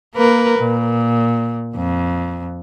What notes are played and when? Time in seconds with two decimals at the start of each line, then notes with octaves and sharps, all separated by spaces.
0.15 A#3 A#4 B4
0.59 A#2
1.75 F2